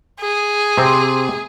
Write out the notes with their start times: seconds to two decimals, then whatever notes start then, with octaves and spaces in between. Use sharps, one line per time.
0.21 G#4
0.78 C3 C4